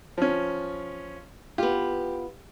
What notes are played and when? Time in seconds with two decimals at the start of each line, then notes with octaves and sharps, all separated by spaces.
0.18 F3 C#4
1.58 B3 F4 G4